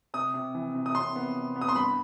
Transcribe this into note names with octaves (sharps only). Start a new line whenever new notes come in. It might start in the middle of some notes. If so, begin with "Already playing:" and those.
C3 D#6
C3
E3
C3
D#6
C3 C6
B3
C3
B3
D#6
C6
G2 B5